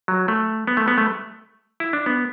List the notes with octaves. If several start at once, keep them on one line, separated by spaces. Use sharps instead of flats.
F#3
A3
B3
A3
B3
A3
E4
D4
B3